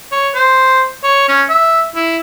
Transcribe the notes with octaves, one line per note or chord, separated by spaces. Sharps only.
C#5
C5
C#5
C#4
E5
E4